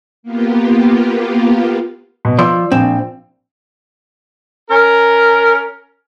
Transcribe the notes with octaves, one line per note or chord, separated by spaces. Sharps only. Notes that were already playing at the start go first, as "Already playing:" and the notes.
A#3 B3 F4 G4
B2
F3 D5 C6 E6
A#1 C4
C#4 A#4